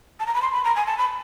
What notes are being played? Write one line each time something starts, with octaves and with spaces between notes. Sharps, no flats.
A5
A#5
B5
C6
B5
A#5
G#5
A5
B5